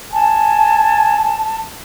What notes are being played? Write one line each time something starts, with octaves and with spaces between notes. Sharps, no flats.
G#5 A5